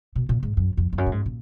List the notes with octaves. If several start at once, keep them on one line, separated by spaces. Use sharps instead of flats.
B2
A#2
G#2
F#2
F2
F2
F#2
A#2
G#2
A#2